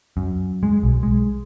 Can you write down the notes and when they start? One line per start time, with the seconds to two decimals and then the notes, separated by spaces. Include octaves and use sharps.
0.17 F#2
0.63 G#3
0.83 B1
1.03 G#3